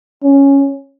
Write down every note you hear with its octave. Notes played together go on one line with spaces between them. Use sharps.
C#4